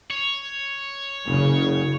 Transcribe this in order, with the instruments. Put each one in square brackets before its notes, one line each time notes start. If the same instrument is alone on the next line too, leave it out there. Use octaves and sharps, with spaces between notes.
[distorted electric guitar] C#5
[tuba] F#1 [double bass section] C#3